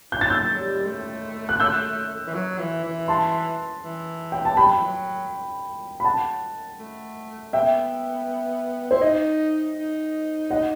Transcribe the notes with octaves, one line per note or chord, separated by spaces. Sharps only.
D#4 G6
A6
E6 G6
F#3
G3
A3
F#6
E6 G6
E3
F#3
E3
E3
A5 C6
E3
G5
A5
G3 G5 B5
F#3
E3
F#3
B5
F#5 A5
A3
B3 E5 G5
E4 C5
D#4 D#5
D#4
D#5 F#5